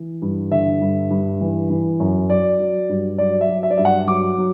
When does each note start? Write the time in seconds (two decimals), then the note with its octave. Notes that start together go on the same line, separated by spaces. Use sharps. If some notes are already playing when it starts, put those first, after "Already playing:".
Already playing: E3
0.22 G2
0.51 D3 E5
0.81 G2
1.11 G2
1.41 E3
1.70 E3
2.00 F#2
2.30 F#3 D5
2.59 F#3
2.89 G2
3.18 F#3 D5
3.41 E5
3.49 F#3
3.63 E5
3.71 D5
3.78 G2 E5
3.85 F#5
4.07 F#3 D6
4.38 F#3